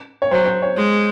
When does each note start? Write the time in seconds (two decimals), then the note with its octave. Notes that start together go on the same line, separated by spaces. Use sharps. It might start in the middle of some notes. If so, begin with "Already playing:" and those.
0.22 C#5
0.31 F#3 C5
0.46 C5
0.62 C#5
0.77 G#3